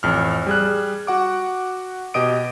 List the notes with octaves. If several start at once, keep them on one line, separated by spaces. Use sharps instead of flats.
A1 F2 F6
G3 G#4 F#6
F#4 F#5 D6
B2 G4 D#5 D#6 D7